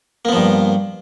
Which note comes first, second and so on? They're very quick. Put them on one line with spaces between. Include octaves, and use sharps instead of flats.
A#3 B3 F3 G2